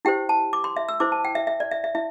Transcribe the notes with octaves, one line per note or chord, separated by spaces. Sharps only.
E4 G4 C5 G5
A5
D6
C6
E5
E6
E4 C5 D6
A5
G5
E5
E5
D5
E5
E5
E4 E5